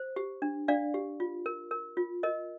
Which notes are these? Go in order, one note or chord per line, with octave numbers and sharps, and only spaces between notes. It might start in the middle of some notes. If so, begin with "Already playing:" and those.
Already playing: C5
G4
D4
D4 D5 F5
G4
F4
A#4
A#4
F4
A#4 D#5